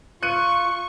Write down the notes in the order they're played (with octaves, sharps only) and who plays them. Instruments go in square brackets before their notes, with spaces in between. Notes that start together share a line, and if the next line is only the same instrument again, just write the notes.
[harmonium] F4 [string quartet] C#6 [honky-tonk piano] F#6 C#7 D#7